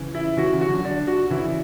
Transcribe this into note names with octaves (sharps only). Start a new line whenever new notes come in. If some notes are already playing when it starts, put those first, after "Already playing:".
Already playing: C#3 E3
E4
C#3 E3 F#4
C#3 E3
F#4
D3 F#3
D4
F#4
C#3 E3 E4